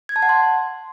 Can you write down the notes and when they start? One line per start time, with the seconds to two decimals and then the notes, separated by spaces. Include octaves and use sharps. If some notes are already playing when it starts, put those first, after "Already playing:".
0.09 G#6
0.16 A5
0.22 F#5
0.29 C6